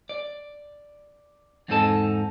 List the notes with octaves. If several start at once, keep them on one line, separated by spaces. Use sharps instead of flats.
D5
E2 G#2 C4 D#4 A4 A5